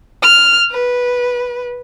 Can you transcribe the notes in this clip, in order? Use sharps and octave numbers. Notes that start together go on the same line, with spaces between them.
F6
B4